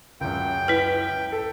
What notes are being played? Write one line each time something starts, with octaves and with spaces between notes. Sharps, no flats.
C#2 F#2 G5
E4 B4
A4